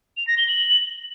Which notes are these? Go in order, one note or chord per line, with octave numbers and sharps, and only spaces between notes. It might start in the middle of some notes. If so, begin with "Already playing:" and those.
F7
A#6
G7
F#7